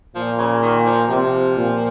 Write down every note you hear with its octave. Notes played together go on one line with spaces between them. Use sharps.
A#2 F3
C#3
D#3
F3
C3 F3
A#2